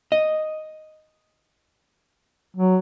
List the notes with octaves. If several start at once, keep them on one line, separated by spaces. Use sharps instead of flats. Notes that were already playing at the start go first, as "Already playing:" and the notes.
D#5
F#3